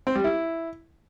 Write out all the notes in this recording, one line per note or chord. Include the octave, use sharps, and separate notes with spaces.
C4
G3
E4